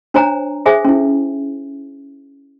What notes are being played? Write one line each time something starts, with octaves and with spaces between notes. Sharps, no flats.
D4 C5 C#5 G#5 A#5
G#4 A4 C5 E5 G#5
C#4 E4